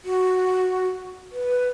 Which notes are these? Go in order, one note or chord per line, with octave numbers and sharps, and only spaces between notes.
F#4
B4